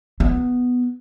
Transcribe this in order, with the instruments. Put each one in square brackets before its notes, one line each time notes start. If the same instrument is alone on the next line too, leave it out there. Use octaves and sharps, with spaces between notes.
[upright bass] B3